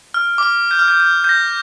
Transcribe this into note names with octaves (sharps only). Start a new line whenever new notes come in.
F6
D6
F6
G6
F6
G6
G6
G6
A#6